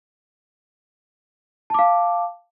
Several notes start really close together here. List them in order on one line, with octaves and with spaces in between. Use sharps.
A5 D6 F5